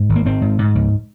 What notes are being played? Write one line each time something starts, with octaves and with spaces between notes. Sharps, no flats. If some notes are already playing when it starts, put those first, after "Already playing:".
Already playing: G#2
G#1
A#3
G#1 C4
G#2
G#2
C#2